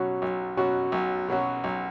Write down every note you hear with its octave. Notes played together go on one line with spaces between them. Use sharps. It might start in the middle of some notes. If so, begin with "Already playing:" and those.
Already playing: B1 B2 F#3 C#4 F#4
B1
B2 F#3 C#4 F#4
B1
B2 F#3 C#4 F#4
B1